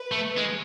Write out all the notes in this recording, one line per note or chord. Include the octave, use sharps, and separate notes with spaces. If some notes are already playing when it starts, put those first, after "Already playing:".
Already playing: B4
A3
G#3